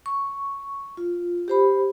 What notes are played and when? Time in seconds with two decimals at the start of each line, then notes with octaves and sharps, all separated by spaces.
0.06 C#6
0.97 F4
1.48 G4 C5 B5